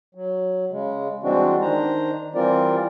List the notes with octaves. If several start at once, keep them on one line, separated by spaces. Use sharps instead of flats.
F#3
C#3 G#3
E3 G3 G#3 C4 D4 F#4
D#3 D4 C5 A#5
E3 G3 C4 F4 A#4 D5